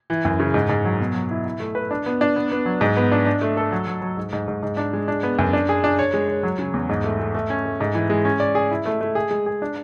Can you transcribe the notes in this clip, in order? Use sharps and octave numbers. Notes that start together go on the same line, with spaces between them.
E3
F#2
C#3
G#2
G#2
F#3
B2
F#3
E4
E4
A3
B4
D4
B3
D4
B3
B3
F#3
G#2
B3
D4
D4
A3
A4
F#3
F#3
F#3
G#2
G#2
G#2
G#2
D4
G#3
D4
B3
F#2
D4
G#4
D4
C#5
G#3
C#5
F#3
C#3
E2
G#2
A3
A3
A3
C#4
A3
G#2
E3
G#3
C#4
D5
G#4
E4
A3
A3
G#4
G#3
G#4
D4